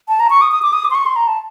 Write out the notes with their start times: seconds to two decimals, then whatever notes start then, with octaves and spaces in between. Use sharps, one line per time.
0.09 A5
0.20 A#5
0.30 C#6
0.42 D#6
0.52 D#6
0.62 D6
0.73 D#6
0.85 D6
0.91 C6
0.95 C#6
1.06 C6
1.16 A#5
1.27 A5